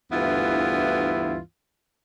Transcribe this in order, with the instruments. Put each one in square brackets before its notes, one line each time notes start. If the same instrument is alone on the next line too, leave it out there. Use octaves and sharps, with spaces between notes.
[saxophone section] D2 G2 E3 B3 E4 F4